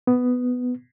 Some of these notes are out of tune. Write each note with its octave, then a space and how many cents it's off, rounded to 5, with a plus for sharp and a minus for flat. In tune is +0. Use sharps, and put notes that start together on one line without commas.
B3 +10